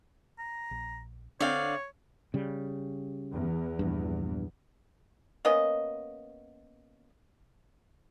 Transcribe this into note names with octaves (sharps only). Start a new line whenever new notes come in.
A#5
A#1
D3 C4 D4 C#5 D5 F5
C#3 G3
E2
A#1 G2
A#3 B3 C#4 D#5